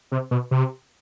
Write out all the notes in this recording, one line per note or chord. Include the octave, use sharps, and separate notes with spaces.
C3
B2
C3